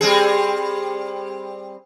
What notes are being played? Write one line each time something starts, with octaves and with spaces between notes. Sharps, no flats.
G3 C4 G#4